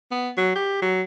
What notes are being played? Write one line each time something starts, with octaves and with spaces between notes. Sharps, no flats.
B3
F#3
G4
F#3